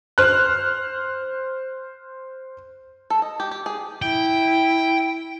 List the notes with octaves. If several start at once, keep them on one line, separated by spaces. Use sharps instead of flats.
C5 F6 F#6
A4
D#5
G4
G4
G#4
E4 G5